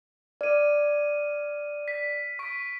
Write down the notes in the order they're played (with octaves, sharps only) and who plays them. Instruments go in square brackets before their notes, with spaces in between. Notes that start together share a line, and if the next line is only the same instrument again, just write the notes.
[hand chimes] D5 [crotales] F6 D#7
[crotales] B6
C#6 B6 D7